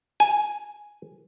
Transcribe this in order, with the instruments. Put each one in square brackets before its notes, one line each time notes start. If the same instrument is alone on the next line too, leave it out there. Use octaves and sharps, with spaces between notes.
[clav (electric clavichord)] G#5